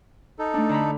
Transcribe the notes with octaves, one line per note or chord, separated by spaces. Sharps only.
D#4 A4
A3 D4
D3 A#5 B5